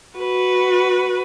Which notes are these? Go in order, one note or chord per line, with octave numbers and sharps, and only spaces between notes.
F#4 B4